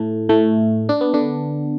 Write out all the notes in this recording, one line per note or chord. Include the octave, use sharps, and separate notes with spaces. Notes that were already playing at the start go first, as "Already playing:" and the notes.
Already playing: A2 A3
A2 A3
D4
B3
D3 D4